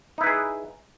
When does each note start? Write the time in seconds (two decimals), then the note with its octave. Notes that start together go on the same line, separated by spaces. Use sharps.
0.18 D#4
0.21 E4
0.24 B4
0.27 G#4